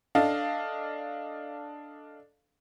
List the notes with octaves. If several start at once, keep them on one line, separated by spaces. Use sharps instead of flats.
D4 A4 D#5 F5